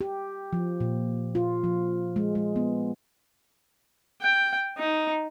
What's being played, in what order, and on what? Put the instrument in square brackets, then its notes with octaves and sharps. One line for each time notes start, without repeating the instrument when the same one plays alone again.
[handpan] G4
F3
A#2
F4
F3
G#3
G#3
B3
[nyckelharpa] G5
D#4